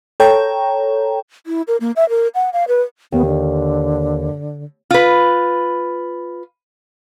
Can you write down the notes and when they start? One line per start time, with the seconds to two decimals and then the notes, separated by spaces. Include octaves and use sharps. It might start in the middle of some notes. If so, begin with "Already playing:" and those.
0.20 A4 C#5 G5 A#5
1.47 E4
1.68 A#4
1.81 A#3
1.96 E5
2.09 A#4
2.35 F#5
2.53 F5
2.68 B4
3.12 D#2 B3
3.26 D3
4.91 F4 B4